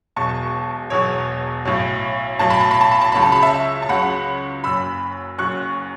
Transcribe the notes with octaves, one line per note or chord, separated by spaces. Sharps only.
E1 E2 B2 F#3 A5 C#6
E1 E2 B2 F#3 C#5
B1 A2 F#3
B1 A2 F#3 A5
B5
A5
B5
A5
B5
A5
C#2 C#3 F#3 B5
A5
B5
E5 A5
A5
C#2 C#3 F#3 F#5 B5
F#1 F#2 F#3 B5 E6
F#1 F#2 F#3 C#6 F#6